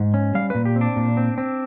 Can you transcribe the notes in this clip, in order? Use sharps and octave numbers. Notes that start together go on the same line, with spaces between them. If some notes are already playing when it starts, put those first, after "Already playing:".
Already playing: G#2
C#4
G3 F5
A#2 B4
G4
C4
D4
A#2
C4
C4